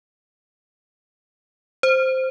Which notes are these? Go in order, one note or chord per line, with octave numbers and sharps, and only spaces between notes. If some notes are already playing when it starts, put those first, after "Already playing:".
C5